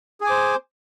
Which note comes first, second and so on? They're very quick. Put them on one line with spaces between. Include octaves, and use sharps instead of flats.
G#4 G#5 D6 C5